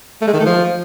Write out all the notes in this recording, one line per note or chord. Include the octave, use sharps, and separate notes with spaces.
A3
G#3
D#3
A3
F3